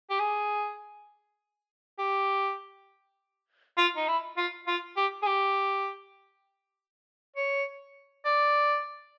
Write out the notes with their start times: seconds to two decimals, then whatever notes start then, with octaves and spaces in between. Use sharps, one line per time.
0.10 G4
0.20 G#4
1.99 G4
3.78 F4
3.96 D#4
4.08 E4
4.37 F4
4.67 F4
4.97 G4
5.23 G#4
5.27 G4
7.36 C#5
8.25 D5